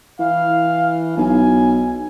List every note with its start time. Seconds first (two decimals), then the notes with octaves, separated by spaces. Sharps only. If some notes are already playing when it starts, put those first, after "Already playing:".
0.19 E3 F5
1.17 B1 G#5